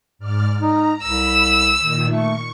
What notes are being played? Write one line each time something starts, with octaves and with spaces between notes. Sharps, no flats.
G#2 D5 F6
D#4 A#5
C2 B5 E6
A#2 D#3
A3 C#6